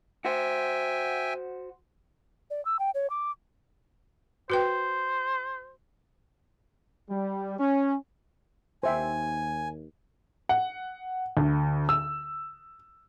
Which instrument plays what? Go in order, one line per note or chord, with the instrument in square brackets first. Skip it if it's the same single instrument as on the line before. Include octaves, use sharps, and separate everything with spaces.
[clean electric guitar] F#4 C5 [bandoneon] E5 G5 G#5
[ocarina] D5
E6
G5
C#5
D6
[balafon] F#4 B4 G5 [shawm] C5
[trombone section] G3
C#4
[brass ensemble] D#2 [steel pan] C5 E5 G5 [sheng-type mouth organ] G#5
[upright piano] F#5
D2
E6